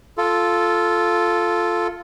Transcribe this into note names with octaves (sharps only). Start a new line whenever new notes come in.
F4 A4